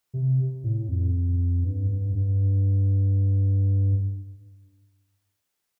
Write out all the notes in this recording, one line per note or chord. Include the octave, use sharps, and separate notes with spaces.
C3
A2
F2
G2
G2
G2